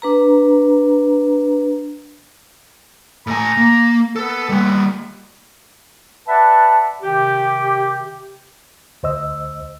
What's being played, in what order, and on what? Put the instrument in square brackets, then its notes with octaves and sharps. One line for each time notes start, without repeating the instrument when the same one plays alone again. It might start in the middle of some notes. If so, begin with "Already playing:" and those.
[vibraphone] D4 B4 A#5
[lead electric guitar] A2 G#5 [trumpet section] A#5
[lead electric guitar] A#3
[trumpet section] B3 [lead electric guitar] A4
[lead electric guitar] G3 A#3
[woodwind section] B4 D5 E5 F#5 A5
C3 D#3 G4
[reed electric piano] D2 C5 D#5 E6